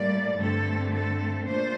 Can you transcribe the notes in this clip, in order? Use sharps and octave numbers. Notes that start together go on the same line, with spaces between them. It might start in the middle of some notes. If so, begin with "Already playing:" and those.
Already playing: A2 G3 A#3 D5
G2 D3 A3 C4 A4
A4
A#2 A3 D4 C5